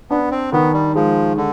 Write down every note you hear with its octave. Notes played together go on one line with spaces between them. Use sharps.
B3 D4
C4
D#3 B3
G3
F3 G#3
D3